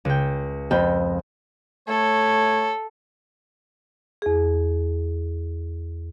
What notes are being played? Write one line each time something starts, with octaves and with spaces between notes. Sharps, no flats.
C#2 G5
F2 G5 B5
A3 A4 C#5
E2 G#4